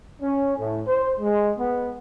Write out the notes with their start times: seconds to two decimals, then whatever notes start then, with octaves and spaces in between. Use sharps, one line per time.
0.22 C#4
0.57 A2
0.87 C5
1.19 G#3
1.58 B3